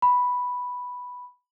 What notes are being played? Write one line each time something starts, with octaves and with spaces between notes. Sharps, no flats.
B5